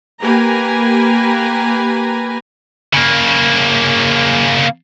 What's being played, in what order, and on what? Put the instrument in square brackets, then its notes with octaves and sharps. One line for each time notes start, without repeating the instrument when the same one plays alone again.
[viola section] A#3 G4 B4 G#5 A#5
[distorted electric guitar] C#3 A#3